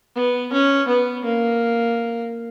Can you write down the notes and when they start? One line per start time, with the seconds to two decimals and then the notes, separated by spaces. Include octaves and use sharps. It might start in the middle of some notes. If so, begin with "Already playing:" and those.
0.16 B3
0.53 C#4
0.88 B3
1.25 A#3